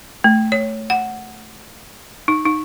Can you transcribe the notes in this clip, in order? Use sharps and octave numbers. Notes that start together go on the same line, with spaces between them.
A3
C#5
F#5
D#4
D#4